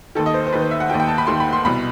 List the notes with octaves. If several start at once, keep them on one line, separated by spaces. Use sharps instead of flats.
D#2 D#3 A4
D#5
C5
C5
D#2 D#3 B4
C5
E5
F#5
D#2 D#3 G5
G5
A5
B5
D#2 D#3 C6
B5
C6
C2 B2 B5